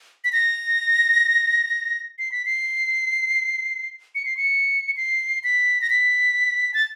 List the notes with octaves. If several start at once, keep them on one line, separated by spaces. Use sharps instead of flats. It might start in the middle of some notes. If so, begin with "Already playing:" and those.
B6
A#6
C7
B6
C7
C#7
C7
C#7
C7
B6
A#6
B6
A6